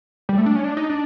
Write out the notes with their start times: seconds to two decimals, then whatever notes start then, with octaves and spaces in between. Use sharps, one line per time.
0.29 G3
0.38 A3
0.46 D4
0.55 C#4
0.64 D4
0.77 D#4
0.89 D4